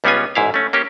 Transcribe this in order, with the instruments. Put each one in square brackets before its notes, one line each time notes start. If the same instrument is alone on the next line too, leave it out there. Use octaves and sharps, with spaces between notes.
[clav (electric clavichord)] C#2 G3 B3 C#4 F4 G#5
A1 G#2 E4 F5
A3 C#4
A#3 C#4 G4